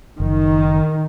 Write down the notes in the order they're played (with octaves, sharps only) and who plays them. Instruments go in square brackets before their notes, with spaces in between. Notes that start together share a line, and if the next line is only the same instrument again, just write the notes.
[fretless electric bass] F#1 [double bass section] D#3